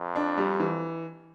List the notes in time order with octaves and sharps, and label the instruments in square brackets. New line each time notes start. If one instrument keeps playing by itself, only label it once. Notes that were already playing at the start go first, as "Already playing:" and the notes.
Already playing: [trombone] F2
[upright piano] D4
G3
E3